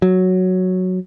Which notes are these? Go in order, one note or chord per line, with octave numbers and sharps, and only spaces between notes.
F#3